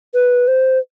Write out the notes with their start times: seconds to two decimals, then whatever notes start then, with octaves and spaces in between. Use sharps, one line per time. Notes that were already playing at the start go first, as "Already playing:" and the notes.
0.14 B4
0.48 C5